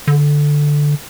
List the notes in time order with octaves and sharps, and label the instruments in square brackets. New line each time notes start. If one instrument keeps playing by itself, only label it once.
[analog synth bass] D3